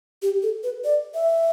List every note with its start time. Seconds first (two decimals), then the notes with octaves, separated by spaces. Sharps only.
0.22 G4
0.43 A4
0.64 B4
0.84 D5
1.14 E5